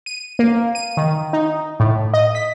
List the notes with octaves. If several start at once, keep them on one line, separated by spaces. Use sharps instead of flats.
D#7
A#3
D#7
D#3
D#4
A2
D#5
B6